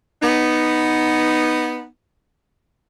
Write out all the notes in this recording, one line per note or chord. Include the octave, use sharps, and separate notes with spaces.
B3 D#4